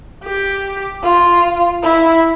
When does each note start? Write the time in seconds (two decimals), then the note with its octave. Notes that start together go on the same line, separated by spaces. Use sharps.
0.24 G4
1.04 F4
1.83 E4